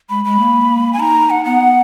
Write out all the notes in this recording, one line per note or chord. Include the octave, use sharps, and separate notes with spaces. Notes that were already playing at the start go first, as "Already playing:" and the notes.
G#3 B5
G#3 B5
A#3
G#5
D#4 A#5
F#5
B3 F#5